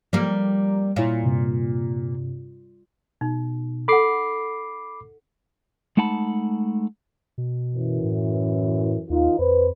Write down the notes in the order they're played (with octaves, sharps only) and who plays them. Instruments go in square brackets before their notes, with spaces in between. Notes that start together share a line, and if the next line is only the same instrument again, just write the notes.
[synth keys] F3 G4 A#5 [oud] G3 A#3
[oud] A#2 [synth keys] E4 C#5 F5
[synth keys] G2 C3
[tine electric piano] B2 [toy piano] D#4
[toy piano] A4 F#5 [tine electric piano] B5 D6 C7
[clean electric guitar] G#3 A3 D#4 F#5 A5 B5
[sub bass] B2
[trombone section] F#2 E3
[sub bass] A2
[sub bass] D#2 [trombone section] D#3 D#4 F4
[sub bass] F2 [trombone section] B4 C5